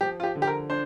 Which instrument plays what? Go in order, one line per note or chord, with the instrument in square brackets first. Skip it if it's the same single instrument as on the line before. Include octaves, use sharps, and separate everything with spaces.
[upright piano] F3 [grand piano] G4
[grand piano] F4
G4
[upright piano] D3
[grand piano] G4
A#4
[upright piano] D4 [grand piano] C5